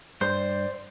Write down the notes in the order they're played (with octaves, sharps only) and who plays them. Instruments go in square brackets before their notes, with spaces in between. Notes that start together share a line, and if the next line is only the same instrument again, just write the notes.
[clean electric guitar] G2 [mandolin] C5 [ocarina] D5